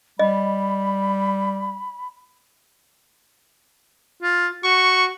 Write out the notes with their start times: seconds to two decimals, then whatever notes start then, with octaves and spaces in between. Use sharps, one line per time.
0.19 G3 D#5 B5
4.23 F4
4.64 F#4 C#6